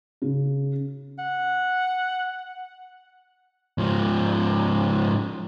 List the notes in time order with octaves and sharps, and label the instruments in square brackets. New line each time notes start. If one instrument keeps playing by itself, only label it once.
[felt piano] C#3
[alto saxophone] F#5
[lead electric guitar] G#2 F3